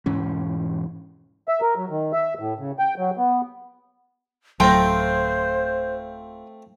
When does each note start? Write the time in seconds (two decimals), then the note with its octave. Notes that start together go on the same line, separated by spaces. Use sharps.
0.06 E1 G#2 E3 C#4
1.48 E5
1.61 A#4
1.77 F#3
1.90 D#3
2.13 E5
2.39 A2
2.59 C#3
2.79 G5
2.98 F#3
3.17 B3
4.60 D1 F#3 A3 C4 F4 C5 G5 A#5